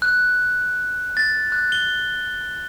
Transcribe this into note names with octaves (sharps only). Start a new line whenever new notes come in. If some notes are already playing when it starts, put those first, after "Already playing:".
F#6
A6
F#6
G7